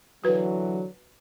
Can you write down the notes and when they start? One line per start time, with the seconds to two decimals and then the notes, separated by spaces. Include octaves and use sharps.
0.24 D3 E3 F#3 F#4 B4